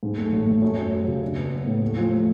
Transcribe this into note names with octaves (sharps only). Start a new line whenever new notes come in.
G#2
A3
A1
A3
F#2
F#2
F#3
C#3
D4
B3
B3
A2
A3
F3
A3